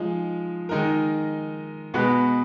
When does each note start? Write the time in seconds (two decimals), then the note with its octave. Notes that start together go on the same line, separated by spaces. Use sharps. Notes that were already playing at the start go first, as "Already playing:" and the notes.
Already playing: F3 G#3 D#4
0.69 D#3 G#3 D#4 A#4
1.94 B2 G#3 B3 F#4 B4